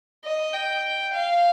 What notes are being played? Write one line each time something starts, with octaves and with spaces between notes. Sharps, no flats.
D#5
G5
F5